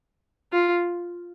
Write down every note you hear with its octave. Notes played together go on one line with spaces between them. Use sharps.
F4